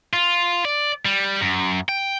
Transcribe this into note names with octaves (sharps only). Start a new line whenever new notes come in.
F4
D5
G3
F#2
G5